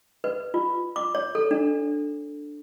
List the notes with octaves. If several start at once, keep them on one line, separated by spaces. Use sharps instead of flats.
B4
F4
D6
C#5
A4
D4